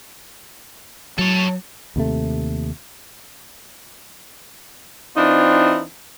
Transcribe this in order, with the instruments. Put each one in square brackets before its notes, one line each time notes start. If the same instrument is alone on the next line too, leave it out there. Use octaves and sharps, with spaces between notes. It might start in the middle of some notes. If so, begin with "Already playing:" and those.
[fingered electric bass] F#3 [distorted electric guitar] A4 C#5
[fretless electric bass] D#2 C3 A3
[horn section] E3 C4 D4 D#4 F4